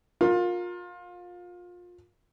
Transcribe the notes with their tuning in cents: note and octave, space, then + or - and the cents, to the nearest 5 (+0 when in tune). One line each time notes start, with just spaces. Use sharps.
F4 +25 A#4 +0